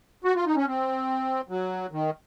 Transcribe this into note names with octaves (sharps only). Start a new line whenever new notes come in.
F#4
F4
D#4
C#4
C4
F#3
D#3